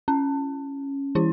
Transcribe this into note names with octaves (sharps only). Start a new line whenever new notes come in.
C#4
E3 E4